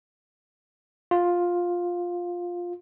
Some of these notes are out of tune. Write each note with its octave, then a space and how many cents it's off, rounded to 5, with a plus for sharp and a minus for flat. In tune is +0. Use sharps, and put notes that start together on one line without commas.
F4 +10